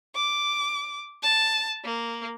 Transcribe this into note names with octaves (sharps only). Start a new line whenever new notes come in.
D6
A5
A#3